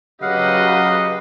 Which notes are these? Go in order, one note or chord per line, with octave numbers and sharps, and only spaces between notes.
C#3 F#3 G4 B4 D#5 F5 F#5